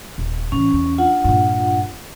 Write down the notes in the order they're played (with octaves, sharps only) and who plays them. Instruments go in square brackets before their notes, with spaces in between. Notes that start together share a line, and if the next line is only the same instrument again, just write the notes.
[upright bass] D#1
[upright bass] A2 E3 [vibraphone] C#4
[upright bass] E2
[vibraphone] D4 F4 F#5
[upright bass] G2 A#2